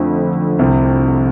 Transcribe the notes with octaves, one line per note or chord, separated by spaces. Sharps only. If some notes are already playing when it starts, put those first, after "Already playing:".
Already playing: F2 D3 A3
C2 C3